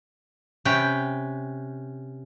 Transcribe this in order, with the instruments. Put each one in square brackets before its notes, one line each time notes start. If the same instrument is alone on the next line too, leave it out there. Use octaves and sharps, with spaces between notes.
[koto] C3 C#4 B4 G5